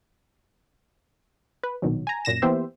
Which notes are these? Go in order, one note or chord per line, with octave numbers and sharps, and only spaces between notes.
B4
A#1 B2 D#3 F#3
G#5 A#5
F#2 A#2 A#6 E7
E3 A#3 B3 G4 C5 E5